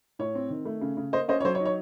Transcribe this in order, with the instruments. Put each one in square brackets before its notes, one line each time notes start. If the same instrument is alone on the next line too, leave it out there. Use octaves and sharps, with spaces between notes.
[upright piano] A2 C#5
C4
D#3
A3
C#3
C#3
A#3 C5 D#5
C#4 C5 D#5
C#5
F#3 C5
C#5
D#4
C#5